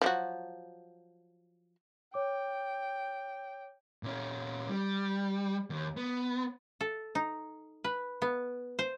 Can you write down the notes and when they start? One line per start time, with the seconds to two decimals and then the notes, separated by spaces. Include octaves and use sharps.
0.02 F3 F#3 F#4
2.14 C#5 G5 D6
4.03 A#2 C#4
4.69 G3
5.70 D#2
5.97 B3
6.81 A4
7.15 D#4
7.84 B4
8.22 B3
8.79 C5